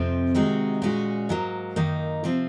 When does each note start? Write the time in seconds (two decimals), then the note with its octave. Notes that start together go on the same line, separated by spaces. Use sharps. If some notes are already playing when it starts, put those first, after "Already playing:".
Already playing: F2 C3 F3 C4
0.35 C3 D#3 G#3 D#4 F#4
0.82 A#2 G#3 C#4 F#4
1.29 G#2 F#3 A#3
1.76 F#2 D#3 A#3 D#4
2.24 C3 F3 C4